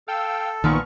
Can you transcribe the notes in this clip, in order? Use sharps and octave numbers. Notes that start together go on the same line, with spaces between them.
A4 F5 G5 E6
B1 A#2 D#3 F3 B3 C#6